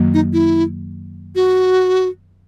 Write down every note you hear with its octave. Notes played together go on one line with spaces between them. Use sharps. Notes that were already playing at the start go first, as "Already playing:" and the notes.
Already playing: F#2 D#3 F#3 A#3
D#4
E4
F#4